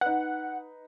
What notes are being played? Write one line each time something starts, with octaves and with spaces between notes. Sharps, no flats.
D#4 B4 F#5